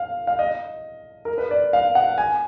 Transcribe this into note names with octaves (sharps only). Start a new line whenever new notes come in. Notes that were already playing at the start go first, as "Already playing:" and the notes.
Already playing: F5
F5
D#5
A#4
B4
D5
F5
F#5
G#5